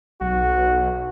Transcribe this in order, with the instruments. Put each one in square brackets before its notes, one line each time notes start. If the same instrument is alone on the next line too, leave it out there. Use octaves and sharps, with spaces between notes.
[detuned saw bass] B1 [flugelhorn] F#4